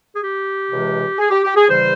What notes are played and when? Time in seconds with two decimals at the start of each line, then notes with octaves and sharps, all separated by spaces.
0.16 G#4
0.20 G4
0.69 C#2 C3 E3 G#3
1.18 G#4
1.30 G4
1.43 G4
1.56 G#4
1.67 E2 C#3 E3 G3 C5